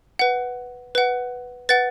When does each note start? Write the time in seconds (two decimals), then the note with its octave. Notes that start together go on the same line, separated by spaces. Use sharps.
0.19 B4 F#5
0.95 B4 F#5
1.69 B4 F#5 A6